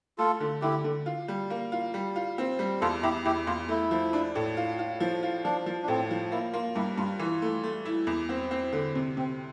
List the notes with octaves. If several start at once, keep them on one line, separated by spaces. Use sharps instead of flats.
A3 F4 A4
D3
D3 E4 G4
D3
F4
G3
A#3
F4
G3
F4
C4
G3
E2 F4 A4
E2 E4 G4
E2 E4 G4
E2 F4
A3 E4
F3
D4
A2
F4
F4
F3
F4
F3 D4
F3
D4
A2 C4
F3
A#3 E4
A#3 F4
G2 E4 G4
G2 F4
E3 F4
A3
A3
E4
E2
C4
C4
D3
C3
C3 C4